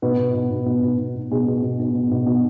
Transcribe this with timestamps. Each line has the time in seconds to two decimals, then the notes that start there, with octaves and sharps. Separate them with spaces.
0.02 B2 B4
0.18 B2
0.34 B2
0.51 B2
0.66 B2
0.83 B2
0.98 B2
1.15 B2
1.31 B2 G#4
1.48 B2
1.63 B2
1.80 B2
1.95 B2
2.11 B2
2.26 B2